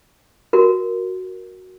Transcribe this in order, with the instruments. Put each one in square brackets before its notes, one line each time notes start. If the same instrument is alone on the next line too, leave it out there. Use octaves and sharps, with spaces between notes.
[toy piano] F#4 A#4